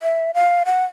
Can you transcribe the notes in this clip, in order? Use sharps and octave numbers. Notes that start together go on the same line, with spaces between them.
E5
F5
F#5